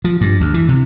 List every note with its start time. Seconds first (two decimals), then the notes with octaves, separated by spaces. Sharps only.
0.04 F3
0.21 G2
0.41 D2
0.54 E3
0.69 C3